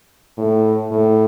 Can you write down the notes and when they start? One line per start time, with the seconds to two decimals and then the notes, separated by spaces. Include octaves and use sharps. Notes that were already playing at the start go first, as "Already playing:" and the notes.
0.37 A2
0.91 A2